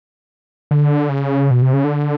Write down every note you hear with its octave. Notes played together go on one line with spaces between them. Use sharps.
D3
C#3
B2
C3
C#3
D3